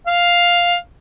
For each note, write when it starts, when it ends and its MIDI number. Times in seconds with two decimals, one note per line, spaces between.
0.07 0.75 77